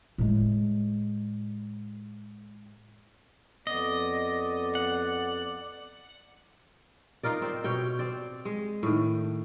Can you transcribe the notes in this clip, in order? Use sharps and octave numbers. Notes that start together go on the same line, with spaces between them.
A2 G#3
F2 B3 D5 D#5
F#5
D#4 F4 A#4 D5
C4 D5
B2 C#5 G5
C4 D5
G#3
A2 D#3